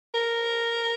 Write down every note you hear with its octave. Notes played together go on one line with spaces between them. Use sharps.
A#4